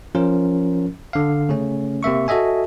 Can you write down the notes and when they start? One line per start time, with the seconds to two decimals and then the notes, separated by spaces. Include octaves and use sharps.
0.15 F3 C#4 F4 A#4
1.13 D3 F5
1.49 C#3 A3 C#4
2.03 C3 A#3 E5 C#6
2.28 F#4 A4 D#5 E5 G#5